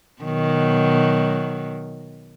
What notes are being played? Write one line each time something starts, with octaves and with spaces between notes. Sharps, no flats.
B2 D#3 F#3